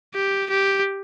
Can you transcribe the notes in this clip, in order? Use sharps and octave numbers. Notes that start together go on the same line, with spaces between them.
G4
G4